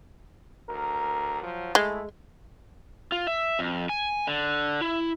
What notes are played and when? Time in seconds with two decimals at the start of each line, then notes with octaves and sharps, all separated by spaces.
0.69 D2 A#4
1.42 F3 F#3
1.75 G#3 A3 E4 G#4
3.12 F4
3.27 E5
3.59 F2
3.89 G#5
4.27 D3
4.81 E4